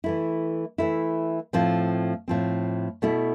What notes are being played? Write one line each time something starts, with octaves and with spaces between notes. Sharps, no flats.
E3 A3 E4
E3 A3 E4
A2 F3 C4
A2 F3 C4
B2 A3 E4